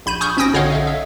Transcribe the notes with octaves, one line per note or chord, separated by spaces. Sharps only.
A#1 B5 G6 D#7
G#5 C#6 D#6 F6 G6
G#1 C#4 G5 G#5 D#6 A#6
B1 D3 C#5 D#5 F5 F#5
E5 F5
E5